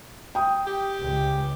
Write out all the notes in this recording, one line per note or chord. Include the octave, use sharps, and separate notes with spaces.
G5 D#6
G4
C#2